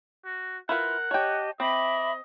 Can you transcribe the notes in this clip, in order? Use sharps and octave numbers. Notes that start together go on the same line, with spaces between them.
F#4
E4 F4 A#4 B4 F#5
G4 C#5 D#5 G5 A5
C4 D#5 E5 B5 D6